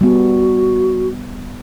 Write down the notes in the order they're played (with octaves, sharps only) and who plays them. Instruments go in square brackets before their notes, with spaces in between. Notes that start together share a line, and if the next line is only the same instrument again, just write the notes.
[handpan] G3 B3 [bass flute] F#4